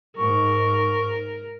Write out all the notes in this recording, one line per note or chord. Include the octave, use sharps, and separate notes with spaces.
G#2 A#4 C#6